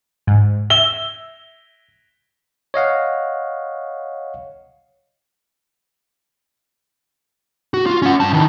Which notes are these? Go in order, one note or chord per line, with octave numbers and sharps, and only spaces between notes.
G#2
E5 E6 G7
C#5 D#5 F5 F#5
F#4
F4
C#4 F#5
G2 A5
D#3 E3